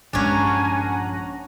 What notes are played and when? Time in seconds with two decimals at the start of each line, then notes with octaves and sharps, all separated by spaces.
0.13 A#1 G2 G#3 C#4 D4 F#5 G#5 A#5